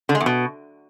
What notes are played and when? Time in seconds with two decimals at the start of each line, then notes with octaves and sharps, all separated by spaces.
0.09 D3
0.15 G#3
0.20 E2
0.26 B2